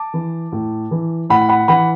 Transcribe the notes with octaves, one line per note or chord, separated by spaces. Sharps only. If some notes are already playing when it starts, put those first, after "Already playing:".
Already playing: A5 D6
E3
A2
E3
A2 F#5 B5
F#5 B5
E3 F#5 B5